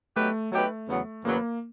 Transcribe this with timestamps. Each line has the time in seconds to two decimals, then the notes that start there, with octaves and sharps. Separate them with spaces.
0.16 F#3 A3 B3 D#4 G4 B4
0.52 F#3 A3 B3 D#4 G4 B4
0.89 E2 C#3 F#3 B3
1.25 E2 C#3 F#3 A#3 B3